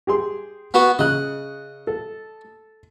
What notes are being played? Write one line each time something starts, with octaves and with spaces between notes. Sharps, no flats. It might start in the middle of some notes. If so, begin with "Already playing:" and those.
G4 G#4 C6
B3 F#4
C#3 D#5 F#6
A4